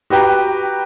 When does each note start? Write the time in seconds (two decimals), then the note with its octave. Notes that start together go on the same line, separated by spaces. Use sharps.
0.10 F#4 G4 B4 G5 A#5